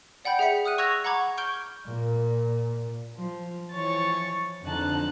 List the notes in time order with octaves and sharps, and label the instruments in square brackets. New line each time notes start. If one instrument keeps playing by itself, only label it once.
[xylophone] D5 F#5 G5 B5 G6
G#4 E5 B6 C#7
F#5 D#6 F6 F#6 D#7
C#6 E6 F#6 G#6 A#6 F7
F#5 A#5 B5 C#6 D6 G#6
C#6 F6 G6 D7 G7
[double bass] A#2
[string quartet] F3
E3 F3 C#5 C#6 A6
F2 D3 D#4 A5 F#6